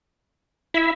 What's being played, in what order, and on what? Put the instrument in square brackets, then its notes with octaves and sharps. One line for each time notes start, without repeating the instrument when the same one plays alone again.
[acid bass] E4 [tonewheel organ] E5